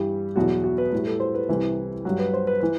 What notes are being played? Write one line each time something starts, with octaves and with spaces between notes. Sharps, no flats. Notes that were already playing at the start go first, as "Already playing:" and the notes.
Already playing: G2 E3 G3
E2 B2 F#3 F#4
F#4
B4
A2 G3
A4
C5
B4
C2 C3 E3 G3 B4
G2 F#3
B4
C5
B4
E3 B4